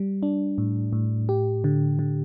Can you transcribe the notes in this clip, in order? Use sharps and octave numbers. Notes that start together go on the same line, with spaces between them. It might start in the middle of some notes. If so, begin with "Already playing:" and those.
Already playing: G3
D4
A2
A2
G4
D3
D3